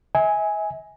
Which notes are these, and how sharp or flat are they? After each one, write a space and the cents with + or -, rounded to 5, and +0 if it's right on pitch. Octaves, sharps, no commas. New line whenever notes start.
E5 -40 G#5 +0